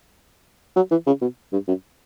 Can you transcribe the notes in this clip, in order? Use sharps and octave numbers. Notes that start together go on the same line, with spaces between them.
F#3
E3
C#3
B2
G2
F#2